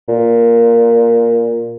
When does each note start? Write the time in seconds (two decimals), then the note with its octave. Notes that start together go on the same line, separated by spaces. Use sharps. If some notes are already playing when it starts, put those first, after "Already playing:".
0.08 A#2